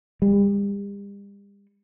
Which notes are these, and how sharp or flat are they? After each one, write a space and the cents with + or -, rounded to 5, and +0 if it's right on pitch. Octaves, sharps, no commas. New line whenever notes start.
G3 +40